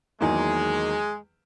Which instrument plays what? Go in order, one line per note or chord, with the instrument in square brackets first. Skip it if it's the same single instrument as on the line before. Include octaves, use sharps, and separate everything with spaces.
[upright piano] E2 D#3 F#3 A#3 E4 [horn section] G#3